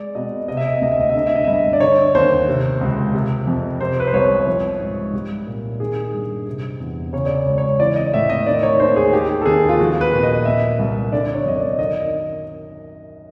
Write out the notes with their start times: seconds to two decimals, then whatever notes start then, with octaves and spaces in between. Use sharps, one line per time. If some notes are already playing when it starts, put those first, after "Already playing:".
Already playing: G#3 D5
0.15 B2 D#5
0.48 C3 D#5
0.57 E5
0.66 D#5
0.74 E5
0.81 D2 D#5
0.92 E5
1.00 D#5
1.10 E5
1.15 D3 D#5
1.27 E5
1.35 D#5
1.44 G2 E5
1.53 D#5
1.73 D5
1.80 D3 C#5
2.15 D#2 C5
2.48 C3
2.81 C#2
3.14 C3
3.47 F2
3.81 C3 C5
4.00 B4
4.07 C5
4.13 C2 C#5
4.47 F3
4.80 G#2
5.13 G3
5.46 A#2
5.80 D#3 G#4
6.14 G2
6.47 C3
6.80 E2
7.13 C#3 C#5
7.26 D5
7.35 C#5
7.46 C#2
7.58 C#5
7.80 E3 D5
7.96 D#5
8.13 A2 E5
8.29 D#5
8.46 D#3 D5
8.63 C#5
8.79 D#2 C5
8.96 G#4
9.13 D#3 G4
9.42 A4
9.45 D#2 G#4
9.69 F4
9.80 F3 F#4
10.01 B4
10.13 A#2
10.23 D#5
10.45 A#2 E5
10.79 C2
11.12 D3 D5
11.34 C#5
11.45 F#2 D#5
11.56 D5
11.78 D#3 D#5